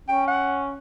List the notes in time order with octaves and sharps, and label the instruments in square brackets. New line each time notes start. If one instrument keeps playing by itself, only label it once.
[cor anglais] C#4 [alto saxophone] G5
[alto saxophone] F#5